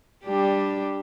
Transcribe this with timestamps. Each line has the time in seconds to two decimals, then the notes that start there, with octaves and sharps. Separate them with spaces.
0.24 G3 D4 G4